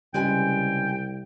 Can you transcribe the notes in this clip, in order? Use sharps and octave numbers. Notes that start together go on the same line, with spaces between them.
C2 C#3 G3 G#3 B4 G5 G#5